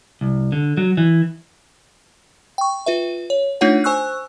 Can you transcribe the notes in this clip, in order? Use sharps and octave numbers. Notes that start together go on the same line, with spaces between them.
C2
D3
F#3
E3
G5 C#6
F4 B4 E5
C#5
A3 D4 D#4 F4 C#5 F#5
C5 G#5 C#6 E6 F#6